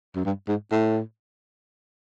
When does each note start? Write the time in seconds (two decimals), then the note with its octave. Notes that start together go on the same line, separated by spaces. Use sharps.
0.16 F#2
0.25 G2
0.48 G#2
0.72 A2